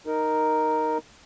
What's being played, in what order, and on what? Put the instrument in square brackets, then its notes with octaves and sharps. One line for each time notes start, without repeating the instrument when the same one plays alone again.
[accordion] D#4 A#4